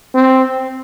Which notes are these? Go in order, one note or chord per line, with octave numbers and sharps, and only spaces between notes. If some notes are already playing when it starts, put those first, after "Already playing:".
C4